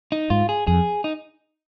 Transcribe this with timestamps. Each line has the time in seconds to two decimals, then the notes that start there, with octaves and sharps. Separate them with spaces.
0.12 D#4
0.30 G#2 F4
0.49 G#4
0.67 F2 G#4
1.04 D#4